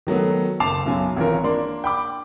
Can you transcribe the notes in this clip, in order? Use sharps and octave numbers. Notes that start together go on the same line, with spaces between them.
D#3 F#3 A3 B3
F#1 A5 D6 A6 C7 F7
B1 F#2 F#3 G#5
G#1 E3 C#4 F4 A#4
A#3 D4 C6
G5 B5 D6